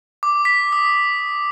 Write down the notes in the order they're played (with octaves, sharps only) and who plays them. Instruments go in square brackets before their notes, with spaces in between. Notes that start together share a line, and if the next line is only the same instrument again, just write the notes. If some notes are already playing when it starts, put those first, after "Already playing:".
[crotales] D6
B6
D#6